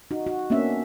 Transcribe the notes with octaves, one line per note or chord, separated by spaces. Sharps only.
D#4 F#4
F#4
A#3 B3 C#4 D4 E5